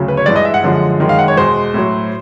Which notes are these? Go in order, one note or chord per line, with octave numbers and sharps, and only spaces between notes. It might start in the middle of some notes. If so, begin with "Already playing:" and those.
Already playing: D2 C#3 F#3
B4
C#5
G2 E3 G#3 D5
D#5
E5
F#5
F#2 D3 F3 G#3
F#2 D#3 G#3
F5
F#5
C#5
E2 B2 G#3 C5
A2 F#3